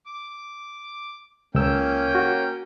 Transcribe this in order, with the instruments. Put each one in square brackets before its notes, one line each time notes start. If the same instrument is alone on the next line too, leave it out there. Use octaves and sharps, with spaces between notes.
[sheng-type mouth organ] D6
[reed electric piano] C#2 E6 [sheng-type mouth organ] A#3 C#4 G5
[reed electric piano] F#4